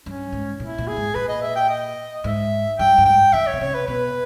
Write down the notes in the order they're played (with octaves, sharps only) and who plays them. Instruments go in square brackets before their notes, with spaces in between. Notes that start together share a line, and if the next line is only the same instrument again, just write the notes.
[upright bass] G2 [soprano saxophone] C#4
[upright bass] G#2
[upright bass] A#2 [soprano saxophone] E4
[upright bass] A#2
[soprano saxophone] G#4
[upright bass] G#2
[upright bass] A#2 [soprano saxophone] B4
[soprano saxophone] D#5
E5
G5
D#5
[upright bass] G#2 [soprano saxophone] E5
[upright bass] G2 [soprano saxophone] G5
[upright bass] G2
[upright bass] G#2 [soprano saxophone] G5
[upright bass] D#3 [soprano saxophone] E5
[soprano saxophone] C#5
[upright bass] B2
[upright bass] C#3 [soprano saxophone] C#5
[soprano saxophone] B4
[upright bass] B2 [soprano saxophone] B4